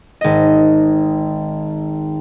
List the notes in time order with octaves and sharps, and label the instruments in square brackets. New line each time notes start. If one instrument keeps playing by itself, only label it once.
[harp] G#1 D#5